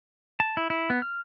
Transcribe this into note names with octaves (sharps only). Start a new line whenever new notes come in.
A5
E4
E4
B3
F6